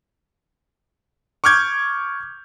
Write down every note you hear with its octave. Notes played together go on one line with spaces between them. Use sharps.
C#6 D6 F6 G6 G#6